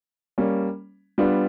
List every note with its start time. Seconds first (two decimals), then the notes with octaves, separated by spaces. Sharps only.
0.38 G3 A#3 C#4
1.18 G3 B3 D4 F4